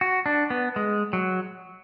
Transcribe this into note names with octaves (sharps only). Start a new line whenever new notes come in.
F#4
D4
B3
G#3
F#3